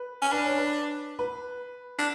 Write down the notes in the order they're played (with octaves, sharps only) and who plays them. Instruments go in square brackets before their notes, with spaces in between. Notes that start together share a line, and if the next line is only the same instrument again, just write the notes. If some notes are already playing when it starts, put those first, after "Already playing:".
Already playing: [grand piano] B4
[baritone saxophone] C#4
[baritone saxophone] D4 [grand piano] B4
[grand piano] C#5
B4
B4
[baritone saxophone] D4